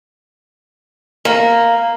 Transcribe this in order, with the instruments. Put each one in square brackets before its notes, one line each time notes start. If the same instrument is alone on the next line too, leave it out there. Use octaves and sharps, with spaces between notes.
[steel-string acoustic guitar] A#3